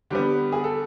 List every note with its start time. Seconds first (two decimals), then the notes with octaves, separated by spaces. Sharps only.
0.10 D3 G3 B3 G4
0.52 G#4
0.64 A4